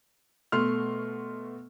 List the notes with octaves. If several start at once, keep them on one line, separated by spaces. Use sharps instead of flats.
B2 A3 C6 F6